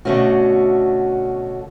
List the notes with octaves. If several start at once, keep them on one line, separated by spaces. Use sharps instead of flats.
B2 D3 A3 C#4 F#4